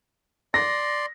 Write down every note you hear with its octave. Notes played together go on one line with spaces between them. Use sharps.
D5 C6 A#6